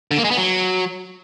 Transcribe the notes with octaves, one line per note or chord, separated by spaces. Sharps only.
D3
A#3
G#3
B3
F#3